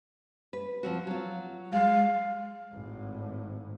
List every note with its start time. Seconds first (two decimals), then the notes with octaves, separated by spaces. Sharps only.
0.53 B4
0.83 F3 C4 F#4
1.07 F#3 F4
1.73 G#3 F5
2.72 G#1 A2